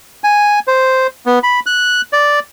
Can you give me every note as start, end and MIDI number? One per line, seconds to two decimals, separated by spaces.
0.24 0.59 80
0.67 1.07 72
1.26 1.39 59
1.43 1.60 83
1.66 2.01 90
2.13 2.40 74